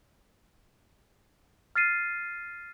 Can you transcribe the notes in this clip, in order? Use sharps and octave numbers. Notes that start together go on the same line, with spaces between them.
F6 A6 C7 D#7